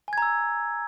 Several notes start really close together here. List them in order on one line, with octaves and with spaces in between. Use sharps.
G#5 G#6 A#5 E6